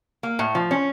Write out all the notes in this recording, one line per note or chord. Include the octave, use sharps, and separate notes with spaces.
A#3
A2
F3
C#4